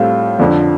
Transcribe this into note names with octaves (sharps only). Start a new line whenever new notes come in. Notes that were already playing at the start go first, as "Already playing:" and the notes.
Already playing: A2 G3 C4 F4 A4
F2 D3 F3